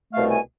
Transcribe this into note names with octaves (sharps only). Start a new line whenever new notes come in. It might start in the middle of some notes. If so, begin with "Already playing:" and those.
C2 B2 A3 F5
G#5